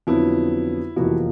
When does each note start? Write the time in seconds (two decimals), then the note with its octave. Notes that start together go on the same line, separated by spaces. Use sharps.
0.07 F2 D3 F#3 B3 E4
0.96 F1 E2 C3 F3 A#3 E4 F#4